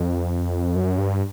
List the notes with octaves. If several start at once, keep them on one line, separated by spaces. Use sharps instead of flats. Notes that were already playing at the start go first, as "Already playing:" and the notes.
Already playing: F2
F#2
G2